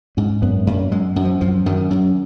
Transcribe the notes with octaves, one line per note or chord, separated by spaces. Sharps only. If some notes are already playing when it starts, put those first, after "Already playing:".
G#2 C#4
F#2 B3
F#2 A#3
F#2 G#3
F#2
F3
F#2 F3
F#2 D#3
F#2